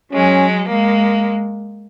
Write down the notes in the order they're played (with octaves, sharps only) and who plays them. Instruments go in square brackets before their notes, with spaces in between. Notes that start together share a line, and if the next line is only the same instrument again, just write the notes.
[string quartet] F#3 G#3 [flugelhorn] C#4
[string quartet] G#3 A#3